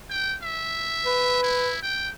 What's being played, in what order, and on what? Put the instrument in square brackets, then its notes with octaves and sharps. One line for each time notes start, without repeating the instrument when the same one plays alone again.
[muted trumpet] G5
E5
[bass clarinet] B4
[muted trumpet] E4
G5